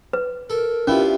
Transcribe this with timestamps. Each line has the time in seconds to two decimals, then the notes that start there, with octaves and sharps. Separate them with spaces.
0.13 B4
0.50 A4 A#4
0.87 C3 B3 C#4 D4 E4 F4